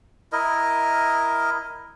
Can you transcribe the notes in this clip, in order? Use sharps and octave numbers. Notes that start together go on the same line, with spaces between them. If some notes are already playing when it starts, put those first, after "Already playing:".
E4 A#4 D#5